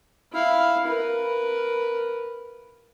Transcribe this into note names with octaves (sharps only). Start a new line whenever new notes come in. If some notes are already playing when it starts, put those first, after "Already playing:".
E4 F5
A#4 B4